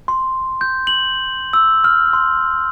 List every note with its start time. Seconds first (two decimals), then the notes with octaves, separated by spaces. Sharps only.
0.08 C6
0.61 G6
0.87 F#7
1.53 E6
1.84 F6
2.13 C6